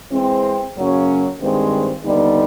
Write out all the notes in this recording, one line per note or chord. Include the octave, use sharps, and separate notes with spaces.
E3 G#3 C4
F#2 C#3 F#3 A#3 C#4
G2 D#3 G#3 C4
D#2 D3 G3 B3 D#4